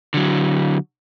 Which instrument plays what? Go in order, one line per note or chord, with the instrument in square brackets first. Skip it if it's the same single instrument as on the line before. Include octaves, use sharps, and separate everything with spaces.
[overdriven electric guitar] D3 F#3